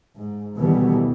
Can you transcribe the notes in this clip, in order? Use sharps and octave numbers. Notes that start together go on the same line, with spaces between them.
G#2
D2 B2 D#3 E3 G3 B3